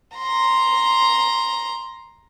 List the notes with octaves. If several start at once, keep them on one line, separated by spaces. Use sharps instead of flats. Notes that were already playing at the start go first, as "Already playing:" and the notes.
A#5 C6